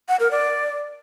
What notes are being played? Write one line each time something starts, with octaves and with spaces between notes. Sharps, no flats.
F#5
A#4
D5